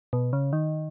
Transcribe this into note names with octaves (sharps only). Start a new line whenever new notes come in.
B2
C#3
D#3